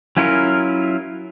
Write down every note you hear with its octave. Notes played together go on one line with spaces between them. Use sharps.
F#3 C#4 E4 F4 A#4